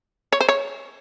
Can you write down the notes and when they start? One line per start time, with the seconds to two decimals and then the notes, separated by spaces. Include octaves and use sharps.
0.32 C#5
0.41 C5
0.49 C#5